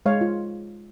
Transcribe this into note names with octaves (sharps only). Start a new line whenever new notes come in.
G#3 C#5 F5
F4